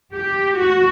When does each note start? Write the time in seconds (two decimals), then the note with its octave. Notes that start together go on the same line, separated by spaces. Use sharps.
0.13 G4
0.59 F#4